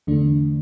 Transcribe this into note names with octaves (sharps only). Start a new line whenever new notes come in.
E2 D3 A3 D4